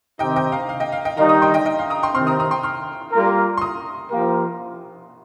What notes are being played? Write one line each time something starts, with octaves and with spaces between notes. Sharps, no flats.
C3 D#3 C4 D#4 G4 D#5 G5
D#5 G5
F5 A#5
F5
D#5 G5
F5
D#5 G5
D#3 G3 D#4 F5 A#5
A#5 D#6
G5 C6
D#5 G5
D#5 G5
F5
A#5 D#6
G5 C6
C3 D#3 C4 C6 F6
A#5 D#6
A#5 D#6
G5 C6
C6 F6
G3 A#3 F4 A#4
C6
A#5 D#6
F3 A#3 G4 A#4